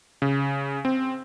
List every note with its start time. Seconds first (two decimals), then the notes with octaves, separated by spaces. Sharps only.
0.22 C#3
0.85 C4